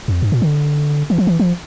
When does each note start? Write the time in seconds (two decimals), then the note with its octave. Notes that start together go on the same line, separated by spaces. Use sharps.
0.08 F2
0.22 G2
0.32 A#2
0.42 D3
1.10 E3
1.18 F3
1.27 E3
1.39 F3